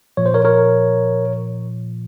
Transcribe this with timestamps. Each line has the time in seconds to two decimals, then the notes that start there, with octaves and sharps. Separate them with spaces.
0.17 A#2 F3 C#5
0.26 C5
0.34 A#4 C#5
0.45 A#4 C#5